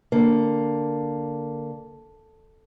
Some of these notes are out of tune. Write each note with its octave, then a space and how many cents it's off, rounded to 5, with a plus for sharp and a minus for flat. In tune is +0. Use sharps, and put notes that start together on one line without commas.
D3 +0 A#3 +0